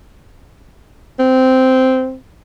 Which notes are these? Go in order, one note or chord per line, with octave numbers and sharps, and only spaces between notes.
C4